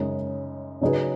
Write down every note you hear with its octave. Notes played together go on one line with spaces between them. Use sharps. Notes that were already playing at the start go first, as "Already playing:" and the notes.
Already playing: F#2 C#3 G#3 D#4
C#3 F#3 D#4 G#4 B4